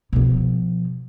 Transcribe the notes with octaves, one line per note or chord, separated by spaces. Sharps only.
B2 F3